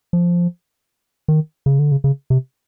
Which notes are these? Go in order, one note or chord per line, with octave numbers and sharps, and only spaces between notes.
F3
D#3
C#3
D3
C#3
C#3
C3